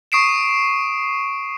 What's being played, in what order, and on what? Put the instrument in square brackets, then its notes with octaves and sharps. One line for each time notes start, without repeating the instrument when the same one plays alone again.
[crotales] C#6 D#6 C7 D7 E7